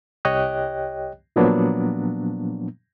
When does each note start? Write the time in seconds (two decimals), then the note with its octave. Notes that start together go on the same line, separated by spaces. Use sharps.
0.25 C2 G4 C#5 D#5 G5 F#6
1.36 A#2 F3 F#3 A#3 B3 D4